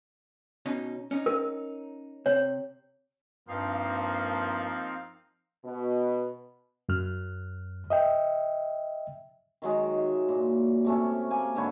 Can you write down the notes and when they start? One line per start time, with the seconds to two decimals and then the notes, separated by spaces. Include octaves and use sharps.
0.66 B2 C#4 D#4
1.11 C#4 D#4
1.26 A#4
2.26 C3 C#5
3.48 G2 F3 A#3 C4 D#4 F5
5.65 B2
6.89 F#2 F6
7.90 D#5 E5 G5
9.62 D#3 F#3 G#3
9.97 E5
10.28 A#2
10.84 C3 A3 C#4
11.31 A#3 G#5
11.55 G#2 D3 E4 C#5